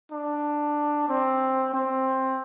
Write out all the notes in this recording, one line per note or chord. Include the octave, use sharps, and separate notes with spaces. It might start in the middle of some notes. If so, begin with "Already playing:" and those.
D4
C4
C4